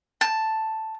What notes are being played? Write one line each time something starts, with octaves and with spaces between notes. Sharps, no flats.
A5